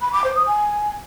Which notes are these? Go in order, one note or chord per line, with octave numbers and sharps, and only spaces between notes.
B5
D6
C5
D#6
G#5